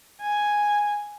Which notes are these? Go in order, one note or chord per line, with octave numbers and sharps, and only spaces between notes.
G#5